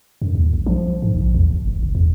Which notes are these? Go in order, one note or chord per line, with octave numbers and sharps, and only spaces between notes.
F#2
D#2
B1
F3
G#2
A#1
E2
G1
F1
G1
E2